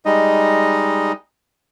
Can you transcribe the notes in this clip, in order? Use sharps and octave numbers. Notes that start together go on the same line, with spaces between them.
G3 G#3 D#4 D#5